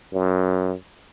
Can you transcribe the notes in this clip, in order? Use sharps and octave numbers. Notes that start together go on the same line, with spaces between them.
F#2